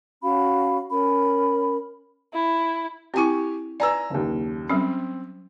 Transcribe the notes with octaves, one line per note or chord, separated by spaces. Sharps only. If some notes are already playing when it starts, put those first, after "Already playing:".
C#4 F#4 F5 B5
C#4 A#4 B5
E4
C4 E4 G4 G#5 C#6
B4 D5 G#5 A#5 E6
F#1 D#2
F#3 G3 C4 C#4